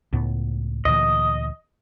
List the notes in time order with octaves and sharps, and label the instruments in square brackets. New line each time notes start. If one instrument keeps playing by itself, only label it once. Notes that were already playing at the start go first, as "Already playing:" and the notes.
[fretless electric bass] C#2 A2 B3
[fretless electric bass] D2 A#2 E3 [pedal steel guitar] D#5